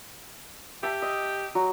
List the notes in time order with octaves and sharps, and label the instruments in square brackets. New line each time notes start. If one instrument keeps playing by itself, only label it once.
[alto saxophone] G4 [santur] E5 A5
[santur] D#5
F#3 F#4